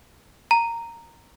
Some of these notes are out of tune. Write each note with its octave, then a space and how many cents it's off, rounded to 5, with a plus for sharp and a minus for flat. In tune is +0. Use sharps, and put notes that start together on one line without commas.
A#5 -10